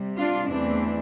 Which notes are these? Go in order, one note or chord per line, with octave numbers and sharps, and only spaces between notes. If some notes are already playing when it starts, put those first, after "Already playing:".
Already playing: C3 G3
D4 F4
E2 E3 A3 C4 D4